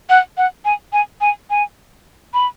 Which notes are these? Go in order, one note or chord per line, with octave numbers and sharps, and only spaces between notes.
F#5
F#5
G#5
G#5
G#5
G#5
B5